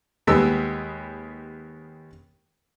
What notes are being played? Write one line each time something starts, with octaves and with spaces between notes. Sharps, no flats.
D#2 G3 G#3 B3 E6